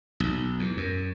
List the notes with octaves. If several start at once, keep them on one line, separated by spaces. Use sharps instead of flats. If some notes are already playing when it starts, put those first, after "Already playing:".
B1
E2
F#2